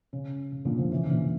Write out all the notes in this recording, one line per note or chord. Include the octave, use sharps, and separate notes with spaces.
C#3
C#3
A#2 D3
D3 F3
C#3 E3
E3
A#2 D3